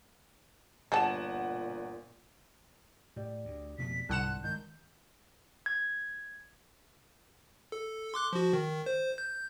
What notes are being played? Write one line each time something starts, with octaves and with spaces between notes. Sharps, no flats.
G1 A#2 G3 A4 F#5 A5 E7
A2 G4 D5
D2
F2 B2 A3 B6
G1 C2 G#2 F#5 A5 C6 F#6 E7
D#3 G#3 G6
G#6
A4
C6 D6 F#6
F3 F#4
D#3
C5
G6